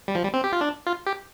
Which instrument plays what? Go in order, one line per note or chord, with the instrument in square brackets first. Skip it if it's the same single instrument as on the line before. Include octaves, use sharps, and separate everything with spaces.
[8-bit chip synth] G3
F3
G3
C4
G4
F4
D4
F4
G4